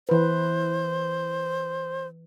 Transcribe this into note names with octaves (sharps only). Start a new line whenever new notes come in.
E3 B4 C5